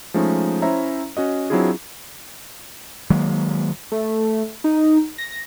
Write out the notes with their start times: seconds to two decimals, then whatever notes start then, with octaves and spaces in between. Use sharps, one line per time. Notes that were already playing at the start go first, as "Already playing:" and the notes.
0.14 F3 G#3 A3 C#4 D#4
0.62 C#4 E4 C5 C#5 E5 A#5
1.17 C#4 F#4 D#5
1.50 F#3 C4 D4 E4 F4 G#4
3.10 D#3 F#3 G#3 A#3
3.92 A3
4.64 D#4
5.18 A#6